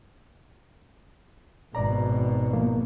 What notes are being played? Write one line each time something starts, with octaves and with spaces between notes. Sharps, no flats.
G#1 B2 D5 A#5
F3 A#3 B3